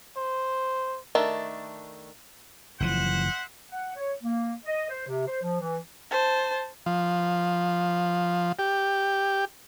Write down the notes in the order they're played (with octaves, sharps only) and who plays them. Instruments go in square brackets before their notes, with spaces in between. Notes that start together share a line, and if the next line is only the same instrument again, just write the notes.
[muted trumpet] C5
[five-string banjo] D#3 A3 D4
[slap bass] F#1 E3 F3 [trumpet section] C5 E5 F#5
[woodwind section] F#5
C#5
A#3
D#5
C5
C3
C5
F3
E3
[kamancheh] C5 A5
[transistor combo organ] F3
G4